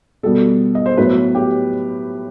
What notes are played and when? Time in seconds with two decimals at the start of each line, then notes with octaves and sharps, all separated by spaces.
0.23 B2 G3 B3 A4
0.75 D#5
0.86 C5
0.97 A2 F#3 B3 B4
1.35 G4